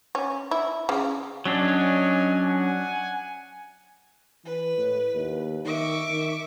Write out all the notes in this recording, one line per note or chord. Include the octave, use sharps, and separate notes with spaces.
C#4
E4
C#3
F#3 C#4 D4 C#5 D#5 G#5
F#5 G#5
E3 B4
A2
D#2
D#3 E5 C#6 D6
D#3